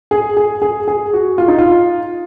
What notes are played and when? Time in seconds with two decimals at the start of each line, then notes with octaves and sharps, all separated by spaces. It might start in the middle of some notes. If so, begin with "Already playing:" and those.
0.11 G#4
0.37 G#4
0.62 G#4
0.88 G#4
1.13 F#4
1.38 F4
1.48 D#4
1.58 F4